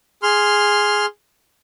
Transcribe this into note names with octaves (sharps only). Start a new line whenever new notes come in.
G#4 C6 F6